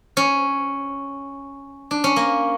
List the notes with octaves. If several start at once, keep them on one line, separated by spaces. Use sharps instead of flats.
C#4
D4
C#4
A#3